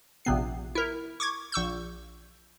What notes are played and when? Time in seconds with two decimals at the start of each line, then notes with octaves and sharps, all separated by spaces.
0.25 A#1 C3 B3 C7
0.75 E4 A#4
1.20 C#6 D6 G#6
1.52 A#1 C#6 E6 G6